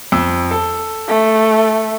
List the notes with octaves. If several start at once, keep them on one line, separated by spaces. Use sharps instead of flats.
F2 E6
A4
A3